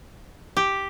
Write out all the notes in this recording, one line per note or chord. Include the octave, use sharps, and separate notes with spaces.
G4